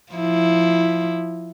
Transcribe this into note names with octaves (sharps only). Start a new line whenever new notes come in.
F3 E4